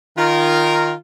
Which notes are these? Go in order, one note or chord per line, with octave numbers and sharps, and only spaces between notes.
D#3 F4 A#4